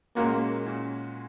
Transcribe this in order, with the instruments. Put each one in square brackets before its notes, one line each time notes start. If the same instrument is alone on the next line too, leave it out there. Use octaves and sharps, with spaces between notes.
[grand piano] A#2 G#3 C#4 F#4 [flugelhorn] A#3
[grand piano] A#2 C#4